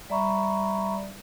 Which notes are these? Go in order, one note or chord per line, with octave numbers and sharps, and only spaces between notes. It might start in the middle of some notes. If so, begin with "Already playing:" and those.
G3 D5 E5 A#5 B5 C#6